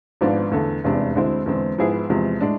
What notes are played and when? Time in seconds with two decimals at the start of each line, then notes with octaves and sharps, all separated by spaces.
0.21 G#1 G#2 F3 B3 D4
0.51 E2 D3 A3
0.84 F1 E2 C3 G#3 D4
1.15 D2 D3 G#3 C4 E4
1.46 E2 D3 G#3 C4
1.78 G#2 F3 B3 E4 G#4
2.10 E2 C3 F3 G#3
2.40 A2 G#3 D4